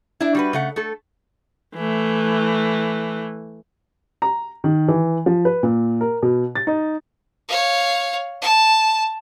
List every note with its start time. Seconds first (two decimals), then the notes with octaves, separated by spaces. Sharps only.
0.20 D4 E4
0.35 G3 F#4 B4
0.53 C#3 A3 F#5
0.76 A3 A4
1.75 E3 A3
4.22 A#5
4.64 D#3
4.88 E3
5.26 F3
5.45 B4
5.63 A#2
6.01 A#4
6.23 B2
6.55 A6
6.67 D#4
7.48 C#5 F5
8.42 A5